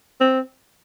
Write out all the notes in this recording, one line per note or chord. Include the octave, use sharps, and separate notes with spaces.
C4